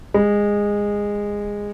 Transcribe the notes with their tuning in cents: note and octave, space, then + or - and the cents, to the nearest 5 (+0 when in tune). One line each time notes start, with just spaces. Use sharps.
G#3 -15